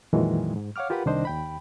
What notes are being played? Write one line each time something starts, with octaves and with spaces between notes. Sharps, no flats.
F2 A#2 D#3 E3 F#3 G#3
G#2
C#5 F5 F#5 D6 F6
F4 G4 A#4 B4 F#5 B5
C2 D#3 D4 C5 D#5
D#2 G5 B5